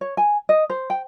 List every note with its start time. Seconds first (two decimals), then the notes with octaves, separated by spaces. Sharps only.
0.01 C#5
0.17 G#5
0.49 D#5
0.70 C5
0.90 G5